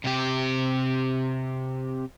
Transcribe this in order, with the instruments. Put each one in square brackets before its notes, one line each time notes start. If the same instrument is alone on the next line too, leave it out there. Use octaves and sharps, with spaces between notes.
[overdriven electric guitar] C3 G4